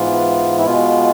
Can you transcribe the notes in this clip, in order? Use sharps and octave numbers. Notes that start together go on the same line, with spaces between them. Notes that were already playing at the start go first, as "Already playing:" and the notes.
Already playing: G#2 E3 B3 F4
E4
B2 G#3 B3 F4